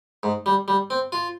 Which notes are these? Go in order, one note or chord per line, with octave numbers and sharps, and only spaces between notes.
G#2
G3
G3
C4
F4